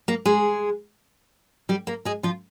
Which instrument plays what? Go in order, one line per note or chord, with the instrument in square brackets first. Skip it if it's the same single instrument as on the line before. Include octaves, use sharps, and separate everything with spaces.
[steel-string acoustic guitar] A#3 A#4
G#3 G#4
G3 G4
A#3 A#4
G#3 G#4
F3 F4